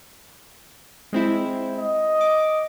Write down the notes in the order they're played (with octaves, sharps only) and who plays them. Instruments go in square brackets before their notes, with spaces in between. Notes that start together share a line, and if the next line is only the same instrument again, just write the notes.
[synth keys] G#3 C4 E4
[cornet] D#5
[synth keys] D6